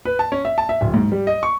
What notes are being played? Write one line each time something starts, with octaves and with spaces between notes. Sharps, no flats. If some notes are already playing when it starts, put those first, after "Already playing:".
B4
A5
C#4
E5
A5
E5
D1
G#2
G3
D#5
C#6